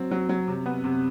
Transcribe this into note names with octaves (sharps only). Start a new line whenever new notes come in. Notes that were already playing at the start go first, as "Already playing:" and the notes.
Already playing: F#3 C4
F#3
F#3
C3
B3
C3